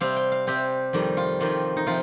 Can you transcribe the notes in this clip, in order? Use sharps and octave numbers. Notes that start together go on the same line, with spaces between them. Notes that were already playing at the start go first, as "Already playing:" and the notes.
C3 G3 C4 F5
G5
F5
C3 G3 C4 G4
F2 D#3 G3
F4
F2 D#3 G3 F4
D#4
C3 F3 F4